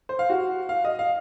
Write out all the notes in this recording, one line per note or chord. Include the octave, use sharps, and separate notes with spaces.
C5
F5
F#4
F5
D#5
F5